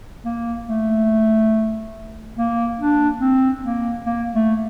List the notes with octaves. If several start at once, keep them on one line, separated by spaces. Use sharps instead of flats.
A#3
A3
A#3
D4
C4
A#3
A#3
A3